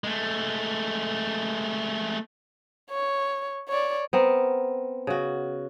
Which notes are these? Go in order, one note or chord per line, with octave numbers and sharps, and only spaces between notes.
G#3 A3
C#5
C#5 D5
B3 C4 A#4
C#3 F#4